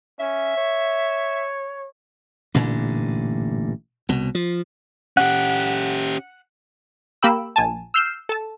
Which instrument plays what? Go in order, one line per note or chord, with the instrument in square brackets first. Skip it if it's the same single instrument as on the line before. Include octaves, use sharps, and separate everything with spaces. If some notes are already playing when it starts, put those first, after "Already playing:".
[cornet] C#4 [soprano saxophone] E5
[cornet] C#5
[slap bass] A1 G2 A#2 D3
C2 B2
F3
[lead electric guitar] C#4 G4 [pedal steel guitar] F#5
[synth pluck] A#3 G4 G5 B5 E6
A#1 G#5 A5
E6 F6 G6 C7 E7
A4 A5